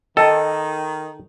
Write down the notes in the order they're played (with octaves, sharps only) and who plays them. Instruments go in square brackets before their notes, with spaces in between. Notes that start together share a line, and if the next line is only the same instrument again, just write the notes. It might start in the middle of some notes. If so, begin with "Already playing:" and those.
[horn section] D#3 [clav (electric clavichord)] A4 [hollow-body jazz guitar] D#5 [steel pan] G5 A5